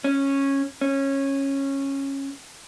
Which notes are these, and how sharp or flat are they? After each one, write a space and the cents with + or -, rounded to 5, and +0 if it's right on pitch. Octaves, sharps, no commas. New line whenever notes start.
C#4 -10
C#4 -15